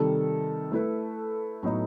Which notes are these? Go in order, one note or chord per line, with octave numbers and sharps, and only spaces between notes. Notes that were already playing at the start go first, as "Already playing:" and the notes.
Already playing: C3 D#3 G3 A4
A3 E4 B4
A2 F#3 B3 D#4